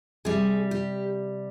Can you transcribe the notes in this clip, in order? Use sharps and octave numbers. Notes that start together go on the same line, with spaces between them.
C3 G3 G#4
G4